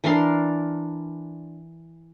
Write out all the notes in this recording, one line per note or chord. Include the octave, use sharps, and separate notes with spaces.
E3 D4 A#4 C6